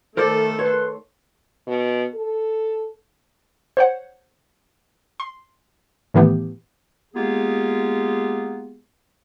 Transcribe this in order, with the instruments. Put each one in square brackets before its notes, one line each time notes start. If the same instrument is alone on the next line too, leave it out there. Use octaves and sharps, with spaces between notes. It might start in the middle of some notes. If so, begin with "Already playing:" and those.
[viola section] D#3 A3 [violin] A4 [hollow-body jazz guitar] A#4 C5 D5
[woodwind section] B4 C6 [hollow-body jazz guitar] C#5
[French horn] B2
A4
[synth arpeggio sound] C5 C#5 F#5
C6
A2 D#3 E3 A3 B3 G4
[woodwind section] G#3 A#3 B3 F4 G4 G#4